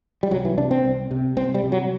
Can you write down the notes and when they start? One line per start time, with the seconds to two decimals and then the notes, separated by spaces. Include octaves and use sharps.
0.23 G3
0.31 C2 F#3
0.45 E3
0.58 C3 D4
0.71 C4
0.85 C2
1.11 C3
1.37 C2 C4
1.54 G3
1.64 C3
1.72 F#3